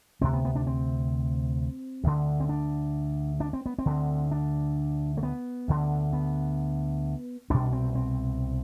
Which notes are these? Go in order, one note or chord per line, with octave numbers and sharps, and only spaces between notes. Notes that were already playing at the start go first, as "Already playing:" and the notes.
D2 C3 C4
B3
B3
D4
C4
D2 D3
C4
D4
D4
C4
B3
C4
D2 D3
D4
A3
B3
D2 D3
B3
C2 B2 D4
C4
C4